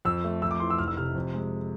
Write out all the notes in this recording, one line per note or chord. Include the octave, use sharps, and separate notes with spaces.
F2 E6
A3
F2 E6
D6
E3 C6
E6
F1 F6
E6
C3 F6
F2
G#3